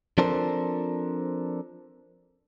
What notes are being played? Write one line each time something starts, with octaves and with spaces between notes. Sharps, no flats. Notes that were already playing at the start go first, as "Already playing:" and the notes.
F3 C4 D4 A4 A#4 C5